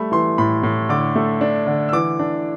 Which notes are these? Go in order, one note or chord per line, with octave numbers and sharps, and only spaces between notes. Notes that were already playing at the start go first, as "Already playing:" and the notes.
Already playing: G3 A3 B5
E3 C6
A2 B5
A2
D3 D6
A3
D4
D3
E6
E3 D6
D4